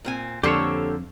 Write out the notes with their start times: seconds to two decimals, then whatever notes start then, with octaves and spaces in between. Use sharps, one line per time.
0.05 A#2 C4 G#5
0.43 F2 D3 A#3 G4 A4 C5 C#5